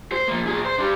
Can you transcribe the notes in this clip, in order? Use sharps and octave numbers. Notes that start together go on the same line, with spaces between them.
C5
F3 A#3
A#2 G#4
C5
D4 G4